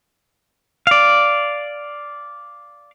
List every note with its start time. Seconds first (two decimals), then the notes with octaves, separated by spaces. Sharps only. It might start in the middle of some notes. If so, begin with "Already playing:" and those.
0.87 D5 F5